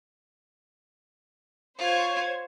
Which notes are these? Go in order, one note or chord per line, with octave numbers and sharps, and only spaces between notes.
F4 C5 C#5 G#6